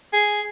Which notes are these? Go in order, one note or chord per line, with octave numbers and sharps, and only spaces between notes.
G#4